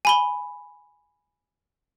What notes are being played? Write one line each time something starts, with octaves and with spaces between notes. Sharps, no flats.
G#5 B5 G7